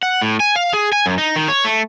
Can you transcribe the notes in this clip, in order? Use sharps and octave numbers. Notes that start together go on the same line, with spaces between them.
F#5
A2
G#5
F5
G#4
G#5
F#2
D#4
D#3
C#5
A3